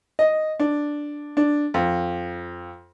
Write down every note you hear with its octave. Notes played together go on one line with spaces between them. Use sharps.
D#5
D4
D4
F2